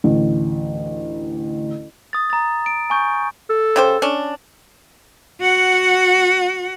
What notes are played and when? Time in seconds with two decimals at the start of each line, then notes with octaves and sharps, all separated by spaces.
0.04 A1 D2
2.13 D#6 A6
2.30 A#5 A6
2.66 D7
2.90 G#5 C#6 G6
3.50 A4
3.76 C#3 G4 C5
4.02 C#4 D4
5.41 F#4 F#5